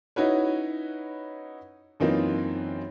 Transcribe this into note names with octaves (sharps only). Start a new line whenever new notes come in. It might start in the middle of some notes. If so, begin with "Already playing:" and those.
C#4 D#4 E4 F#4 B4 C#5
F#2 E3 A#3 C4 D#4 F4